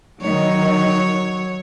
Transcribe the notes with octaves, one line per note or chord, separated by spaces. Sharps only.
D#3 F#3 D#4 C#5